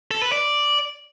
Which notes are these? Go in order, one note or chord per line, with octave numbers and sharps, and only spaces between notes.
A4
B4
D5